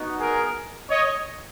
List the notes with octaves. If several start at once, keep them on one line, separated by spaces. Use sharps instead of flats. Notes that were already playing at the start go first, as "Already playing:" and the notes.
Already playing: B3 D#4 F#4
G#4 A#4
C#5 D#5